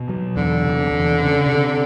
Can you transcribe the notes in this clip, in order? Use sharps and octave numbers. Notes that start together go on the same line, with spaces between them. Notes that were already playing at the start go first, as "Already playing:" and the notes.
Already playing: B2
F#3
E2 D3
C3
E2
C#3
C3